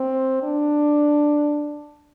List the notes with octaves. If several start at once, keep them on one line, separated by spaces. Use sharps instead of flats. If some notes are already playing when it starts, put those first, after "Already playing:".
Already playing: C4
D4